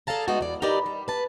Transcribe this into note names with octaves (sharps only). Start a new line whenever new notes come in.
G#4 A4 D5 F5 A5 A#5
G#3 A3 B3 D#4 F#4
E2 D5
D#4 G4 A#4 B4 D5
G3
B4 A5